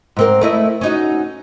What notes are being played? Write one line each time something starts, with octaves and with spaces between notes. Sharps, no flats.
G#2 C4 A#4
A3 E4 D#5
C#4 D#4 F#4